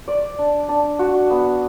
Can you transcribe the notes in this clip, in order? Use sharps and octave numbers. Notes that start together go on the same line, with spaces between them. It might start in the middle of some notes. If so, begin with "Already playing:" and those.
D5
D4
D4
F#4
B3